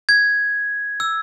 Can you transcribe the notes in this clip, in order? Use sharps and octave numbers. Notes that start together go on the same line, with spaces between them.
G#6
E6